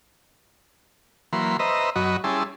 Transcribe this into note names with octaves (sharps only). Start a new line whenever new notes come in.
E3 F#3 A#3 B5 C6
B4 C5 D#5 E5 A#5
F#2 F#3 F#4 D#5 B5
G3 C#4 E4 G#4 A5 C6